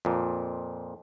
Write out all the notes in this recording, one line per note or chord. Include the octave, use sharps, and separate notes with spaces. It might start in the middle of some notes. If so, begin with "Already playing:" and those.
F2 A#2